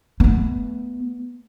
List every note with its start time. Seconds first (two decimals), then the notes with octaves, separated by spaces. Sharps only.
0.20 A3 B3